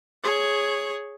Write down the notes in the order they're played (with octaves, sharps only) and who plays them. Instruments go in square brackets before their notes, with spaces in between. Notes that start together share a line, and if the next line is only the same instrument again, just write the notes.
[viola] G#4 C#5